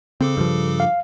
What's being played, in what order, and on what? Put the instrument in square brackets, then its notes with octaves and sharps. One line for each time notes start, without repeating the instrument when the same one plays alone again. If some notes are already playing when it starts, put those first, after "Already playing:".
[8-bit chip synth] C#3 A4 D6 [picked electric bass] C4
[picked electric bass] G2 F3
[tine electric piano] F5